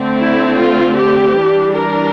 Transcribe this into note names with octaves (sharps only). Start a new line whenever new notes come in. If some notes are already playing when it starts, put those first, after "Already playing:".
Already playing: D3 A3 C4
E4
F4
G4
E3 G3 D4
A#4